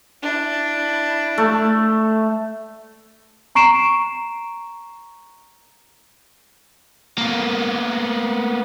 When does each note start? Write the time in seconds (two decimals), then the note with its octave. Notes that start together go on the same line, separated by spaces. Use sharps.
0.23 D4 E4
1.38 A3
3.55 A#5 C#6 C7 D7 E7
7.18 A#3 B3